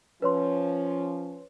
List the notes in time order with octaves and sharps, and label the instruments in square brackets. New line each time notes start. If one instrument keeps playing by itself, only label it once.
[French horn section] F3 C#4 [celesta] B4 C#5 C6